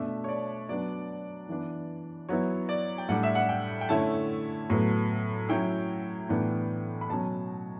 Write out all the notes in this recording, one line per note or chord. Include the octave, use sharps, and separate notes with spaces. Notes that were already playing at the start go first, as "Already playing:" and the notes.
Already playing: B2 A3 D4 E5
C#5
D5
F#3 B3 D4 D5
E3 B3 D4
F#3 B3 E4 C#5
D5
G5
A2 G3 D4 F#5
E5
F#5
G5
G5
D3 A3 C#4 E4 A5
A2 F#3 B3
F#3 C#4 E4 G5
A2 E3 B3 D4
B5
B2 F#3 C#4 A5